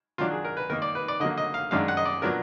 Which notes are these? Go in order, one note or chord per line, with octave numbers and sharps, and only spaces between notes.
D#3 F#3 D4 F4
G#4
A#4
B4
D#3 A#3 D#4 A#4
D5
B4
D5
D3 F#3 A#3 D#5
D#5
F5
F#2 D#3 G#3 D4 F5
F#5
D#5
D5
A#2 F#3 B3 D4 A#4